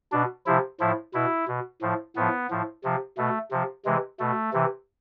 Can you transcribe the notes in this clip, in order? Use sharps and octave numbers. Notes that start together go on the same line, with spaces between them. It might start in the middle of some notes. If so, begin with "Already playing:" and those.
B2 D4
C3 F3 E4
A2 F3 E4
B2 E4
B2
A2 F3
A2 F3 B3
A2 F3
C3 F3
B2 A3
C3 F3
C3 E3 G#3
B2 A3
C3 E3